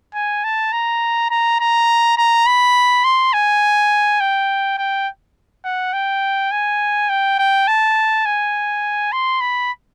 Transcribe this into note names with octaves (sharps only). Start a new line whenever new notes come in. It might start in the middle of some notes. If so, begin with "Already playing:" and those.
G#5
A5
A#5
A#5
A#5
A#5
B5
C6
G#5
G5
G5
F#5
G5
G#5
G5
G5
A5
G#5
C6
B5